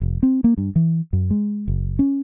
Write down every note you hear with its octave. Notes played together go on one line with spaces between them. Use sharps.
F1
C4
A#3
G2
E3
F#2
G#3
F#1
C#4